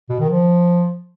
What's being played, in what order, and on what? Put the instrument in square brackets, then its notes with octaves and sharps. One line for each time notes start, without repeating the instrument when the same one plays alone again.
[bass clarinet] B2
D#3
F3